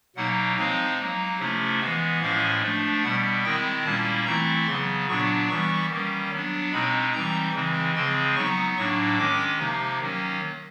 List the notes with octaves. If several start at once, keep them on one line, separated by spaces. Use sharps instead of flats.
B2 F#3 A#3 D#4 F#5
F3 G#3 C4 D#4 F5
F#3 A#3 D#4
C3 F3 A3 C#4 E4
E3 G#3 B3 F5
A2 F3 G#3 C#4 E4 F5
F3 A3 D4
B2 G3 B3 F#5
D#3 G#3 C4 E4 G5
A#2 G3 A#3 C#4 E4 A5
E3 A3 C4 E4 A#5
C#3 F#3 B3 C6
A#2 F#3 B3 D4 C#6
E3 G3 B3 C#6
D#3 G3 A#3 C#4
F#3 B3 D4
B2 G#3 C4 D#4 B5
E3 G3 C4 D#4 A#5
C#3 E3 G#3 C4
C#3 F3 G#3 C4 C6
F#3 B3 D#4 C#6
A2 F#3 A#3 D4 C#6
D#3 G#3 C#4 D6
C3 F3 A#3 D#4
D#3 F#3 A#3 C#4